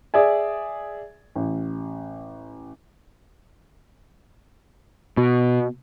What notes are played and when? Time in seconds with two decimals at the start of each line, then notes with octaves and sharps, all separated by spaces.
0.14 G#4 D5 E5 G#5
1.36 A1
5.17 B2